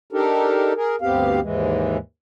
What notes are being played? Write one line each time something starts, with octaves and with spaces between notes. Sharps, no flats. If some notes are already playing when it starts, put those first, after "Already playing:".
D4 D#4 G4 A4 A#4
G#4 A#4
D2 G2 B3 C4 G4 F5
D#2 G#2 E3 G#3